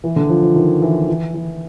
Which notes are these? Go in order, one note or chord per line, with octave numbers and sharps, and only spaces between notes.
E3
D3
F3
F3
D#3
E3
E3
E3